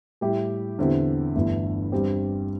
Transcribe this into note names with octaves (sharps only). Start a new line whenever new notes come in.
A2 G3 E4 G4
E2 D3 C4 E4 G4
G1 G2 E3 A3 E4
G2 G3 C4 G4